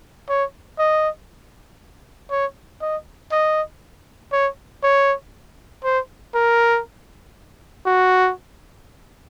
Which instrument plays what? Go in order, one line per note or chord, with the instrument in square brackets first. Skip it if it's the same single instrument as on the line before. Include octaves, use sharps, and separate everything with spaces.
[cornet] C#5
D#5
C#5
D#5
D#5
C#5
C#5
C5
A#4
F#4